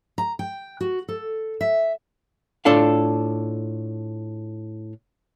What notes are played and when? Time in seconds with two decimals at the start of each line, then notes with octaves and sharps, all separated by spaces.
0.18 A#5
0.39 G5
0.81 F#4
1.08 A4
1.61 E5
2.65 A2 D4 F4 A4 D5 F5